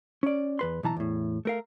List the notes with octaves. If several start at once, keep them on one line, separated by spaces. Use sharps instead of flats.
C#4 D5
E2 B4 C6
B1 E3 A5 A#5
E2 A2
A3 A#4 F5